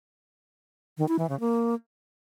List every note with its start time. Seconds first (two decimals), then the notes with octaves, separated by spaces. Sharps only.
0.98 D#3
1.08 E4
1.19 E3
1.29 C#3
1.40 A#3